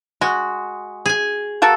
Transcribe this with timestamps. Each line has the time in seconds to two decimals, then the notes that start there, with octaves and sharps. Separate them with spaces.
0.21 G#3 F#4
1.06 G#4 G#5
1.62 A#3 F#4 A4